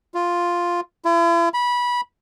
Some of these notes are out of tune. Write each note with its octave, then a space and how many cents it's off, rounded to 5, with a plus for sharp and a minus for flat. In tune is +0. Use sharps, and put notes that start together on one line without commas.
F4 +0
E4 +45
B5 -20